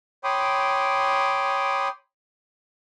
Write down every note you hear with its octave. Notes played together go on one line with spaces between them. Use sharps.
C#5 G5 B5 C6 D6 D#6